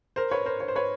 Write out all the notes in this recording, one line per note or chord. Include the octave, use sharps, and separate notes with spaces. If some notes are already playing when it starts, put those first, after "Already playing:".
A#4 C5
B4 C#5
A#4 C5
C#5
C5
B4 C#5